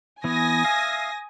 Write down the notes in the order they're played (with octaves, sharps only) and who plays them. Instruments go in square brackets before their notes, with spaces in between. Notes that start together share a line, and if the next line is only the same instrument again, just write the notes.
[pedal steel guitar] E3 B3 [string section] G#5 D#6 A#6
[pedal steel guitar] E5 F5